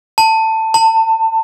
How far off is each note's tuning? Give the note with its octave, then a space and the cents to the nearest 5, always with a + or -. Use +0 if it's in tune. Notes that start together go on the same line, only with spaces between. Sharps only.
A5 +15
A5 +30